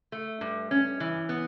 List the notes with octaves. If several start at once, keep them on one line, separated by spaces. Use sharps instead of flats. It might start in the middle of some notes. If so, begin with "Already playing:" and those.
A3
G2
C#4
E3
B3